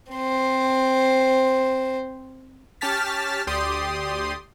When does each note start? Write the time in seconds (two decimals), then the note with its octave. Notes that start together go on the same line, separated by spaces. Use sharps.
0.12 C4 C5
2.81 C#4 G4 A5 F6 A6 B6
3.47 D2 G4 D5 C6 D#6